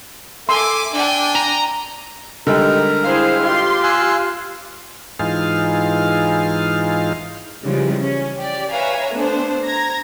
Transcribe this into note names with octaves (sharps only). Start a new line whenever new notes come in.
A4 E5 G#5 C6 D6
D4 G5 G#5
A#5
D3 G3 G#3 D#4 A#4
E4 G#4 C5 F5
F4 G4 C6
G#5 E6 F#6
G#2 E3 D#4 F4 G#4 F6
C#3 E3 F3 G3 G#3
C#4
G4 D5
B4 C#5 E5 F5 G#5 A#5
A3 B3 D4 C5
A#5 G#6 A#6